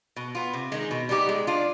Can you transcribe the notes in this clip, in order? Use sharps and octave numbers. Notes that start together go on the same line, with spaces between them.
B2
B3 F4
C3
D#3 G#3
B2
G3 B3 D#4 G4
G#3
D4 F4